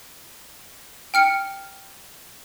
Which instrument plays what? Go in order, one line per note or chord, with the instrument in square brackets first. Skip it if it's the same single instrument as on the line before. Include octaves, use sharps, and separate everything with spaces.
[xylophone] G5 F6 C#7